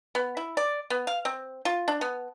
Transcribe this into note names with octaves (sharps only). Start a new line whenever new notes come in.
B3
E4
D5
B3
F5
C4
F4
D4
B3